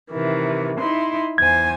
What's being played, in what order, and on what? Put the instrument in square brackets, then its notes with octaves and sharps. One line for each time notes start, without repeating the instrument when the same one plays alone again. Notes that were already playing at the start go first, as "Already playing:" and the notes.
[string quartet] C3 D#3 E3
D#4 E4 C6
[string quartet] E2 C5 G#5 [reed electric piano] G#6